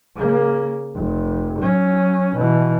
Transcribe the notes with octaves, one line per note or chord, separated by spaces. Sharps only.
C#3 A#3
F1
F#3 C#4
B2 E3